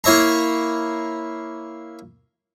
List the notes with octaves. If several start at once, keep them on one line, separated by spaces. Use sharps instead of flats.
A#3 E4 C#5 E5 A#5